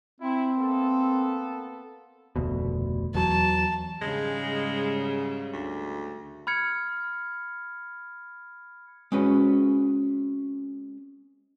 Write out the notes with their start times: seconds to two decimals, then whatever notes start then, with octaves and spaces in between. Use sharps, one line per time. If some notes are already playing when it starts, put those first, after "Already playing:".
0.20 C4 E4
0.58 A#3 B3 A4
2.36 F1 D2 B2
3.14 E2 F#3 A5
4.02 G#2 C#3 G3 G#3
5.53 D2
6.47 B5 F6 G#6 C#7
9.12 G#3 C4 C#4 F#4 B4